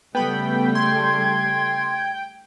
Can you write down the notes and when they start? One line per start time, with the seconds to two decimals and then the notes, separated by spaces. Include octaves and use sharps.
0.15 C#3 G3 A3 B3 G5 B5
0.75 C6 G#6